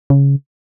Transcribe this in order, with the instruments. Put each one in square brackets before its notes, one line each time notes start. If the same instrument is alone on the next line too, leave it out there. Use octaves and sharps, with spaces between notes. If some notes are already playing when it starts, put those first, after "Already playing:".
[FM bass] C#3